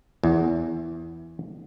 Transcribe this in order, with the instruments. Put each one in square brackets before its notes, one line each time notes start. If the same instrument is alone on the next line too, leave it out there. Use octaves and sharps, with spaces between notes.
[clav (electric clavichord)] E2